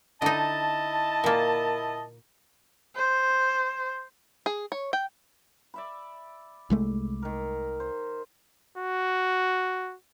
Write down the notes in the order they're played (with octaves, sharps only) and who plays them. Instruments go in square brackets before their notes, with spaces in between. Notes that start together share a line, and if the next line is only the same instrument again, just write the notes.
[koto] D3 D#4 [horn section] E4 D#5 A5
[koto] A#2 A#3
[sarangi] C5
[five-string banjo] G#4
C#5
G5
[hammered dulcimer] D5 E5 B5
[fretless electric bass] C2 G#3 A3
[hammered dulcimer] D#3 A#4
C5
[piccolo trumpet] F#4